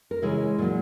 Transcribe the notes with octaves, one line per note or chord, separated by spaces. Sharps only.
A#4
C#3 E3 G#3 E4 G#4
A#2 F#3